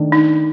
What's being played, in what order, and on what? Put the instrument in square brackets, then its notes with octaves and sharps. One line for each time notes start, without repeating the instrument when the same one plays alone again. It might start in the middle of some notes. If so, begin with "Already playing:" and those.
Already playing: [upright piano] D#3 A3 D4
[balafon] D#4